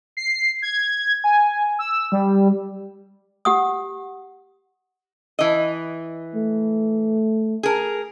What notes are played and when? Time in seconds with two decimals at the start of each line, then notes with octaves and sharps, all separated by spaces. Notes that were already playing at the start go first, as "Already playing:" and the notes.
0.17 C7
0.62 G#6
1.24 G#5
1.79 E6
2.12 G3
3.45 G4 F#5 D#6
5.39 E3 D#5
6.36 A3
7.63 G#4 A#4